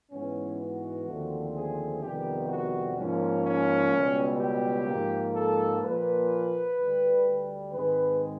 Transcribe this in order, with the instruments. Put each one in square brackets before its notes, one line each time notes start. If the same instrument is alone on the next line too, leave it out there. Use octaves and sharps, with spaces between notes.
[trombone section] G#2 E3 G#3 B3 C#4
F#4
D#2 D3 F3 A3 C4
G#4
F2 C3 D#3 G3 B3 G4
F#4
G#2 F3 A#3 C#4
C#4
C#2 B2 G3
G4
G#2 F3 A#3
A4
A#2 F3 A#3 B4
D2 D3 G3
G#2 D#3 G#3 C4 B4